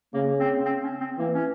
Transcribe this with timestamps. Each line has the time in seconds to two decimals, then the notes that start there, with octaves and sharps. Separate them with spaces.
0.14 C#3 A#3
0.40 C4
0.66 C4
0.84 C#4
1.00 C4
1.18 E3 A#3
1.34 C#4